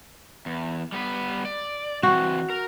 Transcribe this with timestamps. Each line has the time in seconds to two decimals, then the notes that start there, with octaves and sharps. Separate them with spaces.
0.46 E2
0.92 G3 B3 B4
1.45 D5
2.03 E3 C4 F#4
2.50 A#4